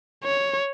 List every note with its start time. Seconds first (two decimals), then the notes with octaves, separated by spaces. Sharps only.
0.24 C#5